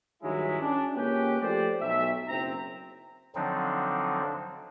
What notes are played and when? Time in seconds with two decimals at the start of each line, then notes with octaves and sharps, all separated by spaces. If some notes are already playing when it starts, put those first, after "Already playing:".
0.22 G2 D#3 F#3 G#3 E4
0.60 C#4 D4
0.95 C#2 A#3 C#4 G4 B4 G5
1.41 F3 A3 G4 C5 D5
1.81 B1 E5
2.29 F#1 C4 A#5
3.35 D3 F3 F#3 C4 D4 D#4